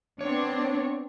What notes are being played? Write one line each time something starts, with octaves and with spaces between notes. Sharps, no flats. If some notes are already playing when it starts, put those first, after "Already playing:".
B3 C4 D4 C#5